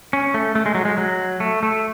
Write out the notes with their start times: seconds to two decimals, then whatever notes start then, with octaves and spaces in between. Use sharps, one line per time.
0.13 C#4
0.34 A3
0.55 A3
0.66 G#3
0.75 F#3
0.85 G#3
0.98 F#3
1.40 A3
1.63 A3